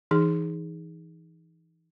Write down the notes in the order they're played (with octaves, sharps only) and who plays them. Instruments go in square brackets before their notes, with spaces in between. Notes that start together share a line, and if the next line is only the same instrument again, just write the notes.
[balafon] E3 D#4 G#4